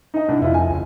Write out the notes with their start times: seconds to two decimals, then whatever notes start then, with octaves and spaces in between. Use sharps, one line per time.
0.14 D#4 D#5
0.28 C2 D4
0.42 F2 E4 F4
0.54 G#5
0.70 C#2